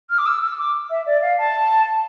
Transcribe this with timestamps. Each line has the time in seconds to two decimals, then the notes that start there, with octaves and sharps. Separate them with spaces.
0.10 F6
0.18 D6
0.26 E6
0.42 E6
0.58 D6
0.90 E5
1.06 D5
1.21 F5
1.38 A5